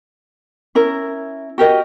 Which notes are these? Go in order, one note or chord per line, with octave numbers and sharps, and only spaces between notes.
C#4 E4 A#4
F#4 G4 A#4 D#5